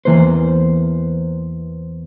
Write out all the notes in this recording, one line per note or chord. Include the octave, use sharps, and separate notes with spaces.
E2 E3 A#3 B4 C5